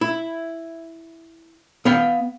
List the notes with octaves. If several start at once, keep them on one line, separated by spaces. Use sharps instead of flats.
E4
B3 F5 G5